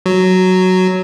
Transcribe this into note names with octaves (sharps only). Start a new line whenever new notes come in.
F#3